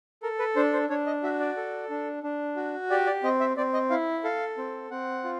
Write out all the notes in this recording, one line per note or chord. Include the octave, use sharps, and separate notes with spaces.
A4 A#4
B4
D4 C5
C5
D4 C#5
D#5
F#4 E5
D5
A4
D4
D4
F#4
G4 D5
D5
C4 D#5
E5
C4 D5
D#5
E4 F5
A4 F5
C4
C4 F#5
F4